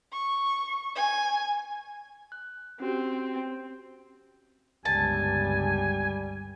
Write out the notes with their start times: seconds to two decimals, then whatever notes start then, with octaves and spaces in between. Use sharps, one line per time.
0.12 C#6
0.95 G#5
2.32 F#6
2.80 C4 C#4 F#4 G4
4.85 G1 C#2 G3 G#5 A5